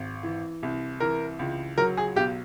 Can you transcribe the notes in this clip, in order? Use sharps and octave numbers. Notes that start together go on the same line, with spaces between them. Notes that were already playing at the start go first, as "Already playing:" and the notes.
Already playing: G#1
E3
C2
E3 A#4
C#2
F#3 A#4
G#4
B1 G4